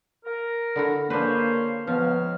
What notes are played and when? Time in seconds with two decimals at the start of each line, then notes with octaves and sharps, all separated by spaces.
0.25 A#4
0.76 D3 E4 F#4
1.10 C#3 A#3 C#4 D4 B4 C5
1.87 C#2 C#3 F3 B3 F6